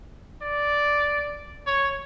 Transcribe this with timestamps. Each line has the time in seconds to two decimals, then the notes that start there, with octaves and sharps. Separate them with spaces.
0.42 D5
1.67 C#5